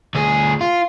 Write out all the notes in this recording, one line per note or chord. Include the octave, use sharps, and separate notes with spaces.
D2 G#4
F4